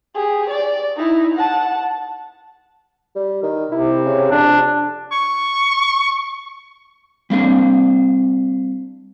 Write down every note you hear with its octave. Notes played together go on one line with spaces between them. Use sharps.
G4 G#4
D5
D#4 E4
F#5 A5
G3
D#3
C3 E4
C#3
F2 D4
C#6
G3 A#3 C4 D4